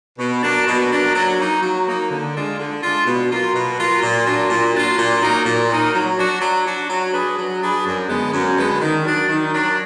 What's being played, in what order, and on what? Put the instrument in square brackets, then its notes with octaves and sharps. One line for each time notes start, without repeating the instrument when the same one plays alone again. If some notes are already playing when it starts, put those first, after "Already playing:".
[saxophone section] B2
F#3 A#3 D4
B2
F#3 A#3 D4
F#3
A#3 D#4
F#3
A#3 D#4
D3
G#3 D4 F4
D3
G#3 D4 F4
B2
F#3 A#3 F4
B2
F#3 A#3 F4
A#2
F#3 D4 F4
A#2
F#3 D4 F4
A#2
F#3 A#3 D#4 A#4
A#2
F#3 A#3 D#4 A#4
F#3
D4 F#4
F#3
D4 F#4
F#3
D4 G#4 B4
F#3
D4 G#4 B4
F#2
D3 G#3 B3
F#2
D3 G#3 B3
D#3
F#3 D4
D#3
F#3 D4